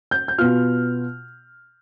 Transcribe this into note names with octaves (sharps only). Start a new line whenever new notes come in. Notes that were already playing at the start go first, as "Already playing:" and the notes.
G6
G6
B2 B3 F4 F6